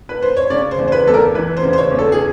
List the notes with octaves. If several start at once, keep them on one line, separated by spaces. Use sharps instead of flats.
B4
C5
C#5
C#3 D5
C5
E2
C5
B4
E2 A4
A#4
E3 B4
C5
C#3
C5
C#5
E2
A4
G#4